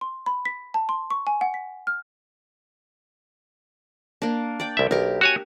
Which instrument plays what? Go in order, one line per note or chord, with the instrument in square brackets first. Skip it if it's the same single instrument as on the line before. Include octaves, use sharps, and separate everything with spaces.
[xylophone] C6
B5
B6
A5
C6
C#6
G#5
F#5
B6
F6
[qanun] A#3 D4
D5 G5
[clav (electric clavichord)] C2 E5
[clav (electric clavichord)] B1 [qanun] G4 A#4
[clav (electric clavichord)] F#4 C#5 G#5